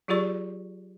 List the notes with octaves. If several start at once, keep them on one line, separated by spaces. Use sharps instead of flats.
F#3 F4 G4 G#4 D5 C#6